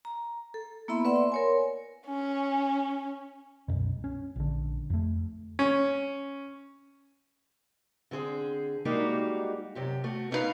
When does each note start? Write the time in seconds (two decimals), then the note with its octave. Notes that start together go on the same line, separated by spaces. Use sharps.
0.05 A#5
0.54 A4
0.88 A#3 B3 E4 E5 B5 C6
1.05 B4 D5 E5 F#5 C6
1.16 C6
1.32 A#4 C#5 G#5
2.07 C#4
3.68 C2 F#2 B2
4.04 C#4
4.36 A#1 D3
4.90 F2 A3
5.59 C#4
8.11 D3 C4 G#4 C5
8.85 G3 G#3 A#3 D#4 F#4 G4
9.75 F#2 C3 G4
10.04 A3 F#4
10.31 B3 C#4 D#4 E4 B4 F5